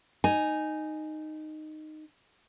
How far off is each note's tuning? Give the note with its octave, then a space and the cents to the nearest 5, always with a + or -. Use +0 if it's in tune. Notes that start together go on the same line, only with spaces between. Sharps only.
D#4 -10 G#5 +0